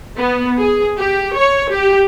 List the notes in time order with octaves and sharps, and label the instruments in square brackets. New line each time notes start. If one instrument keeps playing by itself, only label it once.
[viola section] B3
G#4
G4
C#5
G4